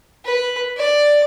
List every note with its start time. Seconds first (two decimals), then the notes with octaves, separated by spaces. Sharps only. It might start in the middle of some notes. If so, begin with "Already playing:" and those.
0.25 B4
0.77 D5